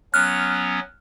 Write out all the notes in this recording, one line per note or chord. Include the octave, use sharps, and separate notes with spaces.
F#3 B3 C#4 F6 F#6